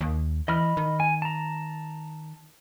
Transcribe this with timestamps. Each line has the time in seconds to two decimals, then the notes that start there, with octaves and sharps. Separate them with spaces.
0.01 D#2
0.48 E3 D#5 B5 F6
0.77 D#3
1.00 G#5
1.22 A5 A#5